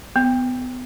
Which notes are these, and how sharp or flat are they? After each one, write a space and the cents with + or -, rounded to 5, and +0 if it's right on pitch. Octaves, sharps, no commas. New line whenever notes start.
B3 +30